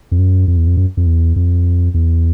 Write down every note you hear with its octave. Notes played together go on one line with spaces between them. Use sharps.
F2
F#2
F2
E2
F2
F#2
F2
E2
F2
E2